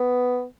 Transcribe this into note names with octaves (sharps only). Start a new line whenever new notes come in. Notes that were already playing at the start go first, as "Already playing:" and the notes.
Already playing: B3